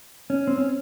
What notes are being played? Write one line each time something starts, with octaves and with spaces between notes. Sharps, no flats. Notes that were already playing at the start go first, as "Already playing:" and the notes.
C#4
C4
C#4